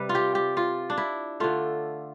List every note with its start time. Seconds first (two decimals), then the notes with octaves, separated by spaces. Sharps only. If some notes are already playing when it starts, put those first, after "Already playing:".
Already playing: C3 G3 B4
0.09 F4
0.15 G4
0.35 G4
0.57 F4
0.90 D4
0.98 E4
1.40 D3 A3 F4